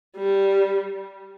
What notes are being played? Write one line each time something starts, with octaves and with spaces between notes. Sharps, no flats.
G3